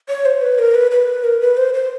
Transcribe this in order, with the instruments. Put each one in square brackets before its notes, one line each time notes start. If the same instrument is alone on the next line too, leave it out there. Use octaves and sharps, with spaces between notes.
[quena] C#5
C5
B4
A#4
B4
B4
A#4
B4
C5
C5